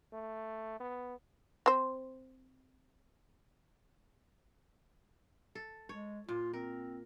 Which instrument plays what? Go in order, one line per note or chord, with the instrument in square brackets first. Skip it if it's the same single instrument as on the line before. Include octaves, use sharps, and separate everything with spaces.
[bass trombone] A3
B3
[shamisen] C4 C5
[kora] A4
[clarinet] G#3 [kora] C#5
[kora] A#2 [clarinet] F4
[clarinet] C4 [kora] A#4